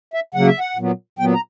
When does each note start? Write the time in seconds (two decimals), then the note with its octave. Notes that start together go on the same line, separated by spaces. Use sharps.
0.14 E5
0.34 C#3 F#3 A#3 F#5
0.47 E5
0.60 F#5
0.77 A#2 F#3 B3
1.19 A#2 F#3 B3 G5
1.34 A#5